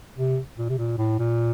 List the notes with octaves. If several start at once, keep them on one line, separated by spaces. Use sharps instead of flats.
C3
A#2
C3
A#2
A2
A#2